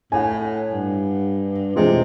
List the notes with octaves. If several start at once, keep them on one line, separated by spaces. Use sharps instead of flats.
A2 F#5 G#5
G2
E1 C3 G#3 F4